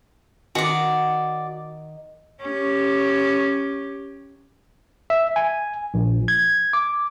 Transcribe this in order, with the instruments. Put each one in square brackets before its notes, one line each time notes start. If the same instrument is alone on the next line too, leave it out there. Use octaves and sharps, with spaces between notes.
[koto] D#3 [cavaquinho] F#4 D5
[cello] C#4 G4
[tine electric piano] E5
G#5
A#1
G#6
D6